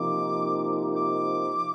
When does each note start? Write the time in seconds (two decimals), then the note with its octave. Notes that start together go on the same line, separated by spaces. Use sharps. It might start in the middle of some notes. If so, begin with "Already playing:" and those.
Already playing: C3 F3 A#3 D#4 D6
0.95 D6